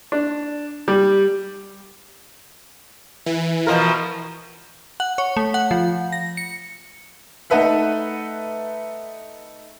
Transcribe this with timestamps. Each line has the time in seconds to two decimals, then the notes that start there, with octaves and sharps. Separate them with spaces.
0.12 D4
0.88 G3
3.26 E3
3.67 B2 F3 A#4
5.00 F#5
5.18 C#5
5.37 A3
5.54 F#5
5.71 F3
6.12 A#6
6.37 C#7
7.50 A3 D#4 A4 B4 E5 F#5